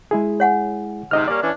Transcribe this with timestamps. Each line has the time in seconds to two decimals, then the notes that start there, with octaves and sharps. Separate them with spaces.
0.11 G#3 E4 G#4
0.40 C#5 F#5 G#5
1.11 G#2 C3 D#4 D#5 F6
1.28 G3 A#3 C#4 D5
1.42 E3 C#4 D4